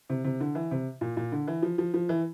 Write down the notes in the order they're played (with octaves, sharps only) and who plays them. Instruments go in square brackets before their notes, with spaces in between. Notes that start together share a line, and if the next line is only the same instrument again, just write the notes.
[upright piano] C3
C3
D3
E3
C3
A#2
A#2
D3
E3
F3
F3
F3
E3